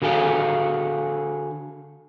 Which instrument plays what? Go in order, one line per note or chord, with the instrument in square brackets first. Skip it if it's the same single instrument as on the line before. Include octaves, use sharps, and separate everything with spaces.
[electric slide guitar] D3 F#4 G#4 A4 F5